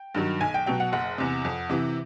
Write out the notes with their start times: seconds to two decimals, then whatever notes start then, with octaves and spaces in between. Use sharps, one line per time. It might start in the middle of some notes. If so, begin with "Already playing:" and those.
Already playing: G5
0.14 G2 D#3 F#3
0.41 B1 G#5
0.54 G5
0.66 B2 F#3 G5
0.80 F#5
0.93 F#1 F#5
1.18 E2 C3
1.45 F2
1.70 C3 E3